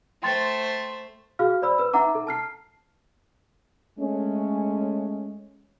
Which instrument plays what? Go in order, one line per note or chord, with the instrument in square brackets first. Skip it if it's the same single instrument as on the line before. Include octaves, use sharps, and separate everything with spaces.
[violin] A3 C5 [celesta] G5 C6 A6
[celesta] F#4 G#4 F5 F6
C5 D5 B5 E6
B4 E6
D#4 E5 F#5 A#5 D6
A4
A5 F6 C7
[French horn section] G#3 A3 C#4